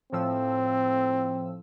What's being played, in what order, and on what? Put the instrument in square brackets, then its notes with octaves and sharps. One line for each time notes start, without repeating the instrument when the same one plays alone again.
[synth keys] A2 F3 E6 [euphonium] C4